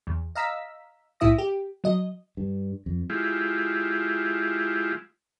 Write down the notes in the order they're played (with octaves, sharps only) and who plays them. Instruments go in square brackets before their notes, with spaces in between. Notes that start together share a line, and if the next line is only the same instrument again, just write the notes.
[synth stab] E2
D#5 F5 A#5 E6 B6
B1 A2 E4 E5 D#6 A#6
G4
F#3 D#5
[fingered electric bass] G2
F2
[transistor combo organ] G#3 E4 F4 G4